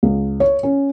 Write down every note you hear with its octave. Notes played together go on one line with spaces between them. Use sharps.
C#2
C#5
C#4